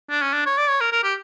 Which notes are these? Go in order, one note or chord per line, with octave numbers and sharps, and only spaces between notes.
D4
C#4
D4
C#5
D5
C#5
A#4
A#4
G4